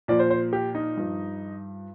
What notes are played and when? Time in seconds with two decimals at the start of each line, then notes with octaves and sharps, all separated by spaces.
0.08 A#2 F3 D5
0.19 C5
0.30 C5
0.53 G4
0.75 D#4
0.97 G2 F3